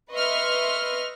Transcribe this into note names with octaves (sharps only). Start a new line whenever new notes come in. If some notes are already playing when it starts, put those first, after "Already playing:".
B4 D#5 E5 C6 C#6 F6